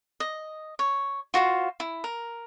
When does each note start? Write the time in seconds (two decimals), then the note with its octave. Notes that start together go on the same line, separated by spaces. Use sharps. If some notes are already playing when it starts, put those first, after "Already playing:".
0.20 D#5
0.79 C#5
1.34 F4 F#4 C5 F5
1.80 E4
2.04 A#4